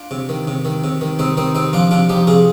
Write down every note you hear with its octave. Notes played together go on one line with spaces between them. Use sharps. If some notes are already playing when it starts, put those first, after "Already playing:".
Already playing: D4 F4
C3
D#3
C3
D#3
C3
D#3
C3 C4 D#4
D#3 C4 D#4
C3 C4 D#4
F3 D4 F4
C3 D4 F4
F3 D#4 G4
C3 F4 G#4